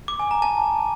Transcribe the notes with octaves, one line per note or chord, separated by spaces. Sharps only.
D6
G#5
A#5
A5